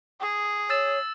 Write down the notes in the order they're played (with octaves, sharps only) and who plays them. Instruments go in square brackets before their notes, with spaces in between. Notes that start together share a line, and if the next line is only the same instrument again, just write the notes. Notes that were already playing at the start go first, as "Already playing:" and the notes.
[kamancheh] G#4
[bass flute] C#5 [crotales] E6 A6 E7